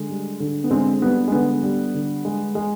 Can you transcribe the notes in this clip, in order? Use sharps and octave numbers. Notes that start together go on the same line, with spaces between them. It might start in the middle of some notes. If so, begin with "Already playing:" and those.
Already playing: D3 G#3
G3
D3
B3
D3 G#3 C4
G3 B3
G#3
D3 B3
G3
D3
G#3
G#3